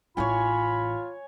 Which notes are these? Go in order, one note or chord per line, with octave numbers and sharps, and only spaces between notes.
A1 E4 F4 C#5 G#5 B5